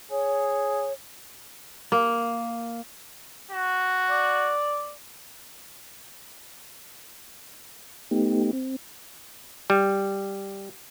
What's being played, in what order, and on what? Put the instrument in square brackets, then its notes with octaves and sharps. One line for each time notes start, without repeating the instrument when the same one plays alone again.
[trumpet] G#4 [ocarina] C#5
[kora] A#3
[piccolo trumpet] F#4
[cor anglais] D5
[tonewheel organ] A3 B3 D#4 G4
C4
[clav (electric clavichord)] G3